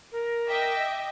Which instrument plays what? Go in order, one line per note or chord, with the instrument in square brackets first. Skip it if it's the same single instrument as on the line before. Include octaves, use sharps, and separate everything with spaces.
[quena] A#4
[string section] D#5 E5 D6 [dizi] G5